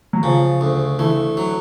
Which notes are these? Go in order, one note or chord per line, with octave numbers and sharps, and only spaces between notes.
F#3
C#3 F3
D2
E3 A3
F#3